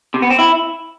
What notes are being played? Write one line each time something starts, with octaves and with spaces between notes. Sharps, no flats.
C3
B3
C4
E4